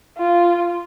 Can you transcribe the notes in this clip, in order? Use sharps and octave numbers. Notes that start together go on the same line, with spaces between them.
F4